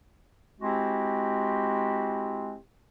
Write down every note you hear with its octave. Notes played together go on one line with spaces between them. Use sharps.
G#3 C4 E4 F#4 G4